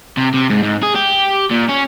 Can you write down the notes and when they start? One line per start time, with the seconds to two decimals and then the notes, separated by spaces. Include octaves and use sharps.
0.17 C3
0.34 C3
0.50 G#2
0.63 G#2
0.83 G#4
0.96 G4
1.51 A#2
1.69 C#4